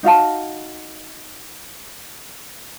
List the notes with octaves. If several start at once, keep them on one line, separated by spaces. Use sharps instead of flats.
D#4 F#4 F5 A5